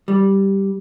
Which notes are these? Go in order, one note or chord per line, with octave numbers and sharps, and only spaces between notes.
G3